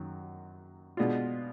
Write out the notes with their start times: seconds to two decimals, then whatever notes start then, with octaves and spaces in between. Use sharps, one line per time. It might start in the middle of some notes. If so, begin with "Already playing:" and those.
Already playing: F#2 D#3 F#3
0.97 B2 G#3 B3 D4 F4